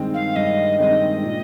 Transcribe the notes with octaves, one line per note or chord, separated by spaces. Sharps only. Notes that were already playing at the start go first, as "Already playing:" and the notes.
Already playing: G2 D#3 G#3 C4
F5
G2 D#5
D#3 G#3 C4 D#5
A#2